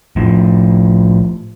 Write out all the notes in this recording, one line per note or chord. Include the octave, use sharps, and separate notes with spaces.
A2 F3